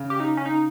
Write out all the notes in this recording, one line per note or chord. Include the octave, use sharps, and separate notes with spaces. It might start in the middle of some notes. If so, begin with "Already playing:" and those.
Already playing: C#3
G4
D#4
C#4
D#4